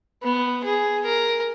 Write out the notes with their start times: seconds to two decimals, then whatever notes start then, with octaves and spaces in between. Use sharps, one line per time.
0.23 B3
0.64 G#4
1.05 A#4